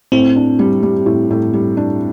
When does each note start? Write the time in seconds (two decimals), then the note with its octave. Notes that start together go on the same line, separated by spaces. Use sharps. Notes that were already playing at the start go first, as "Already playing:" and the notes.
0.12 A2 C4
0.36 D4
0.59 G3
0.83 G3
1.06 A2
1.31 A2
1.53 G3
1.77 D4